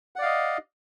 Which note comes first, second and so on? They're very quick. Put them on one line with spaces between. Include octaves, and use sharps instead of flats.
F#5 D5 F5 D#5